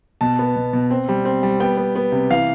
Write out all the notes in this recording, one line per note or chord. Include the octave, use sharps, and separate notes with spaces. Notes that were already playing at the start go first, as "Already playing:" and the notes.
B2 A5
B3
B2
B2
C4
G3
C4
G3
B3 G5
B3
B3
C3
E3 F5